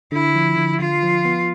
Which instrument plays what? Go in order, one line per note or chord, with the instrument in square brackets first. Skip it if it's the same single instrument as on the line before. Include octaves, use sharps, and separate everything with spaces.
[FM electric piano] D3 [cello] E4
[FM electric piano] F3
D3
[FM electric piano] D3 [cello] F4
[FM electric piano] F3
B3